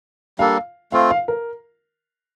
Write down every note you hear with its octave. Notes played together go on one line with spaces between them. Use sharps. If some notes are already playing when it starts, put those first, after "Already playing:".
G3 A#3 D4 A4 F5
A3 C4 F4 F5
F5
A#4